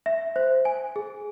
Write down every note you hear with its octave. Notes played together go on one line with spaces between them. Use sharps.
E5
C5
G#5
G#4